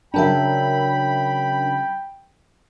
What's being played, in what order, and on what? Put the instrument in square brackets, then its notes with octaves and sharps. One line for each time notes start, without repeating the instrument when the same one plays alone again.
[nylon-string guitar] C#3 F#3 A5 [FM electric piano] D4 A#4 E5 [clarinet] G5 [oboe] B5